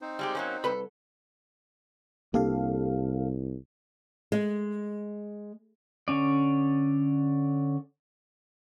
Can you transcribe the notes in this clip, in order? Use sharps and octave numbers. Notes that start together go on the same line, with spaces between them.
C4 D#4 C5
G3 G#3 G4
F#3 A#3 C#4
C2 A4 B4 B5
C2 A#3 D4 G4 A4 F5
G#3
D3 C#4 D5